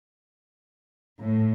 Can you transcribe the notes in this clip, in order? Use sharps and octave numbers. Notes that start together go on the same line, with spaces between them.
A2